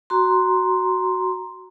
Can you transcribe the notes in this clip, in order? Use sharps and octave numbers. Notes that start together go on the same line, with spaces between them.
F#4 A#5 C6